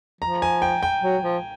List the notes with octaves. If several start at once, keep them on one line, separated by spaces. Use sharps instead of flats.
F3 A#5
G#5
G5
G5
F#3
F3